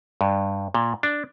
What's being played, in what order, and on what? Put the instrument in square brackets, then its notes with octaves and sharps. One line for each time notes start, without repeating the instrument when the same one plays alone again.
[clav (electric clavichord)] G2
A#2
D4